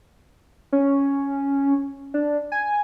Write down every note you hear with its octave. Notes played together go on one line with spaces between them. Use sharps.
C#4
D4
G#5